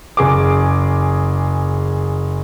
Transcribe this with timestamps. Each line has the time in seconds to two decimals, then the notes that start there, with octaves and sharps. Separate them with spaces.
0.17 F#1 G#4 D6